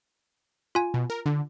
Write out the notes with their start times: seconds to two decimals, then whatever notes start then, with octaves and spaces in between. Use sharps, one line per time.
0.75 F4 G#5
0.94 B2
1.10 A#4
1.26 D3